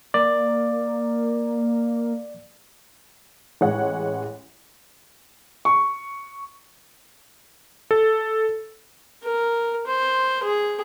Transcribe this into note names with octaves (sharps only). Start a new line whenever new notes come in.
A#3 D5
A1 G#3 C#5 F#5
C#6
A4
A#4
C5
G#4